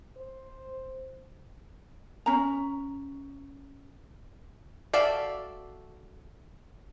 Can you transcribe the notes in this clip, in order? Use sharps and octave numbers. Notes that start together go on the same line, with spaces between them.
C5
C#4 A#5
F#4 A4 D5 E5 F5